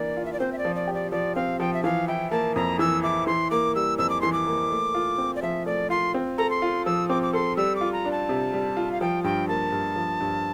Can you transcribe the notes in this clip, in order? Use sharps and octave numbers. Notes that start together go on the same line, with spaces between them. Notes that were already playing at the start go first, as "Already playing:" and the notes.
Already playing: E3 A#3 D4 D5
F4
E5
D5
C4 C5
E5
D5
F3
D5
G4
D5
F3 D5
C4 F5
F3 G5
E5
E3 F5
E4 G5
A#3 A5
F2 A#5
E3 E6
E4 D6
E3 C6
A#3 D6
G3 E6
F2 E6
D6
E3 C6
D6
A#3
A3
F4
C4
D5
F3 E5
A3 D5
F4 C6
C4
A4 A#5
C6
F4
F3 E6
C4 D6
D6
A4 C6
G3 E6
D6
F4
A#5
D4
A5
C3
G3
F4
F5
F3 G5
G2 G5
A#3 A5
G2
F3
G2